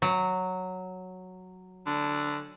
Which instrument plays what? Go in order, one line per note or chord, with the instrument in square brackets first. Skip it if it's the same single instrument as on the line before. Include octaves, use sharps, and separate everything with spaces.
[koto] F#3
[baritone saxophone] D3